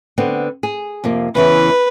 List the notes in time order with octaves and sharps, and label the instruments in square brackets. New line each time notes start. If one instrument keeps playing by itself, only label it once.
[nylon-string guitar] D3 B3 C4
G#4
F2 C3 A#3
[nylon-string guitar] E2 C#3 E3 [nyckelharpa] B4